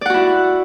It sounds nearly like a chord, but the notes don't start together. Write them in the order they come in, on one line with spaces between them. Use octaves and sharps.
D5 F#5 F#4 E4